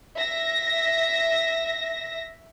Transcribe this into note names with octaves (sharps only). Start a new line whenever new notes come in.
E5 A#6